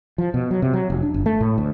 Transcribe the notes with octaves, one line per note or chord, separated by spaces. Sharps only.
F3
B2
F#3
C3
F#3
F1
D4
G1
A3
A2
D2